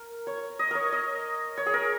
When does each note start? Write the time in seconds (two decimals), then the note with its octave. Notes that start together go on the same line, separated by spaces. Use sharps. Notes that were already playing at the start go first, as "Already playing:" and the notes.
Already playing: A#4
0.27 C#5
0.59 D#5
0.71 A#4 C#5
0.92 D#5
1.57 C#5
1.66 G#4
1.74 A#4